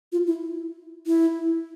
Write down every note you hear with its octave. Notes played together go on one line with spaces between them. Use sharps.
F4
E4
E4